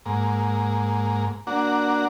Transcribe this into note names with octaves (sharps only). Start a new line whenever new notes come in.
G#2 A#3
A#3 D4 F#4